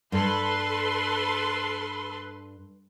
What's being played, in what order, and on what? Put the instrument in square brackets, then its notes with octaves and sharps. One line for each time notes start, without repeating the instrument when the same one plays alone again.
[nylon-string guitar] G2 [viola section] A4 B4 C6